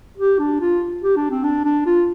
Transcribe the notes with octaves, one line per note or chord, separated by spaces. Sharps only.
G4
D4
F4
G4
D4
C4
D4
D4
F4